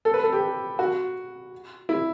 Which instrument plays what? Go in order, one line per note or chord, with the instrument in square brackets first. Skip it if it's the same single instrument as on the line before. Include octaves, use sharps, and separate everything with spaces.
[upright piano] A4
B4
A4
G4
F#4
E4